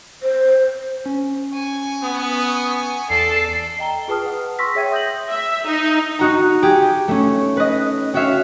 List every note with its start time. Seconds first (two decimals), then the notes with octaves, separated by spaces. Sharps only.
0.23 C5
1.06 C#4
1.53 G#5 C#6
2.03 B3 D#6
3.10 E2 A4 D5 A5 C7
3.79 D#5 G5 A#5 G7
4.08 F4 G#4 B4 A5 D#6 F6
4.26 B4 F#5
4.59 C6 C#6 E6 A#6 B6
4.75 G#4 C#5 E5 G5 G#6 D#7
4.92 D#6 G6 A#6 F#7
5.29 E5
5.66 D#4
6.19 D#4 F#4 A#5
6.62 G4 G#4
7.08 A3 C#4
7.57 B4 D#5
8.14 C#4 F#4 C#5 E5 F5